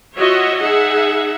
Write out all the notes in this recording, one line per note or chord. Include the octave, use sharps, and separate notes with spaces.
F4 F#4 C#5 D#5 E5 F#5
D#4 G#4 E5 F#5